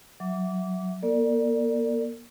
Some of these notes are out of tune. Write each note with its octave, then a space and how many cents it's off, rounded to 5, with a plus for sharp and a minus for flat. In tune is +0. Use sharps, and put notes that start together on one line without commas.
F#3 +0 E5 +0 D6 -25
A#3 +40 A#4 -40 D5 +0